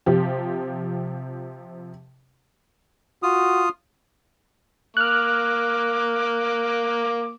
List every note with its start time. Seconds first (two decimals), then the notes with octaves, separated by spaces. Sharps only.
0.06 C3 F3 G4
3.23 F4 F#4 D#6
4.97 A#3 D6 F6 F#6